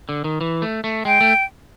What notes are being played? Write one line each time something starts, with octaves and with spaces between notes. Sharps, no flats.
D3
D#3
E3
A3
A3
G#3 G5
A3